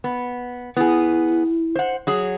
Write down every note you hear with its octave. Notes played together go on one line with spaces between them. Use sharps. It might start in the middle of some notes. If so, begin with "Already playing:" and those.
B3
B3 E4 G#4
C5 F#5
F#3 G#4